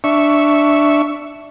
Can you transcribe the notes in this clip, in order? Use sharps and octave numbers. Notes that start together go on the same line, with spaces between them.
D4 E5 C#6